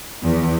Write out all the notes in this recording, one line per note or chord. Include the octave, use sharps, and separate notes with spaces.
E2